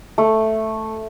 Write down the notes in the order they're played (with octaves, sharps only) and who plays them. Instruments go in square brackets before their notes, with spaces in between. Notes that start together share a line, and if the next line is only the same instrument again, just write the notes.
[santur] A3